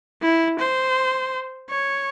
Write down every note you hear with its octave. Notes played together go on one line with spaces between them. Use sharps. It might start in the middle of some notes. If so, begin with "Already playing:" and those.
E4
C5
C#5